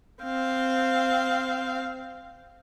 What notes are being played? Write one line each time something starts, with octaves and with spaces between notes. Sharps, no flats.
C4 F5